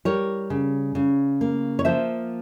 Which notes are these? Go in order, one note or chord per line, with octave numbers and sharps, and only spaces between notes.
G3 A#4 C#5
C#3
C#3
A#3
C#5
F3 C5 E5